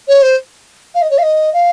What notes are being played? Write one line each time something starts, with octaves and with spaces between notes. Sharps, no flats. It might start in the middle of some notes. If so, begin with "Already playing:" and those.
C#5
C5
F5
D#5
C#5
F5
D#5
F5